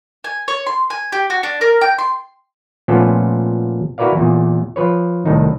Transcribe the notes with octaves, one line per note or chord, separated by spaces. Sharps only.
G#5
C#5
C6
G#5
G4
F#4
D4
A#4
G5
C6
A#2 F3 A3 B3 C#4 A4
E4 F#4 A#4 B4 D5 F5
E2 A#2
F3 B4 C#5
C2 A2 D#3 D#4